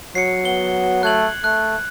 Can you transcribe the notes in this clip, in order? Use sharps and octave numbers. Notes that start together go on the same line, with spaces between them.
F#3 C7 C#7
B3 G7
A3 F#6 G#6 F#7
A3 F#6